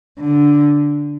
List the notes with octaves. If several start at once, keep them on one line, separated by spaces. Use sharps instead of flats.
D3